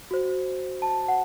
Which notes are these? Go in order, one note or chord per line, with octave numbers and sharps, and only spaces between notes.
F#4 C5
A5
F#5